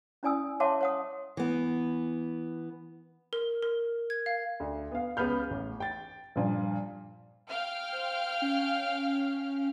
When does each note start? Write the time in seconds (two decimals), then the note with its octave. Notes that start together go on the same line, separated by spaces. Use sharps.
0.23 C#4 E4 D5 G#5 D#6 E6
0.60 C#5 E5 F#5 A5 C6 D6
0.81 C#5 F#5 D#6
1.37 E3 B3
3.33 A#4
3.63 A#4
4.10 G#6
4.26 F5
4.60 D2
4.92 B3 F5
5.17 C#2 B3 B5 F6 G6
5.50 A1
5.80 G5 A6
6.36 G2 A#2 F3
7.49 F5 G5 F6
7.93 C5
8.42 C#4